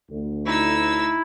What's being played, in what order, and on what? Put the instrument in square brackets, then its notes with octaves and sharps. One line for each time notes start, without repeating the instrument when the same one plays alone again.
[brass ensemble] D2
[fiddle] D#4 E6 [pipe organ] E4